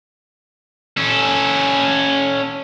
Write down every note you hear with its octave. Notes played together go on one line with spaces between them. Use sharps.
C#4 A4